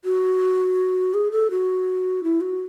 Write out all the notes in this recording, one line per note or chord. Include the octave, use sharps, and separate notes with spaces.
F#4
G#4
A4
F#4
E4
F#4